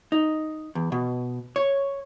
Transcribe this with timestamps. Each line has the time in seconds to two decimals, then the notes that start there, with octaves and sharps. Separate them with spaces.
0.12 D#4
0.75 E2
0.92 B2
1.56 C#5